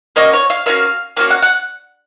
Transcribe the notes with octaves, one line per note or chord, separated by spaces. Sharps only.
A#3 C#4 F#4 D#5
C#5
F5
A#3 C#4 F#4 F5
A#3 C#4 F#4 F5
F#5
F#5